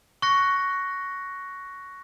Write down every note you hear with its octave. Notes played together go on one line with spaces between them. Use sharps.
C#6 F#6 A#6 C#7